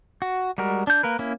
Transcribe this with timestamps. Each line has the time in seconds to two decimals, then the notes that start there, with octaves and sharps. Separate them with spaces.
0.22 F#4
0.58 G3 G#3 F#4 A#4
0.87 D4 G6
1.03 A#3 A#4 B4
1.19 A#3 C#4 E4